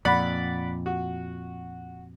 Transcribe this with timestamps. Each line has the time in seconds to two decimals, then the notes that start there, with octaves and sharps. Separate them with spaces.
0.05 F2 A#2 D5 F#5 B5
0.86 F#4